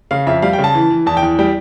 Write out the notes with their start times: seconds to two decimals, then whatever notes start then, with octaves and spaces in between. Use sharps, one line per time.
0.11 C#3 F5
0.27 F2 E5
0.42 G3 F5
0.53 G5
0.59 C#3
0.64 A5
0.75 E3
0.90 E3
1.06 E2 A5
1.17 G5
1.22 E2
1.39 G3 G5